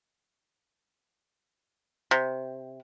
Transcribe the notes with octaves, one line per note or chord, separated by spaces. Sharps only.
C3